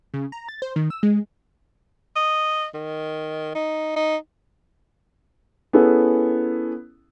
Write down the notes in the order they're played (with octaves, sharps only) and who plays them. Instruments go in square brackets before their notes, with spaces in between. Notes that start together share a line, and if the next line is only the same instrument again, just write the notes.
[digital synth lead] C#3
A#5
A6
C5
D#3
E6
G#3
[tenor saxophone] D#5
D#3
D#4
D#4
[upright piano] B3 C#4 E4 G#4 A4